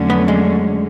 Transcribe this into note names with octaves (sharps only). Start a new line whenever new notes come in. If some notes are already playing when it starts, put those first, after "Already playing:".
Already playing: F2 D3 F#3 A3 C#4
B3
G#3